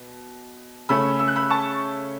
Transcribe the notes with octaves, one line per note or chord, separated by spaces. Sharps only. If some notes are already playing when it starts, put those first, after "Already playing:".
Already playing: B2
C#3 A3 C#4 B5 E6
E6
F#6
B5 E6
A5 C#6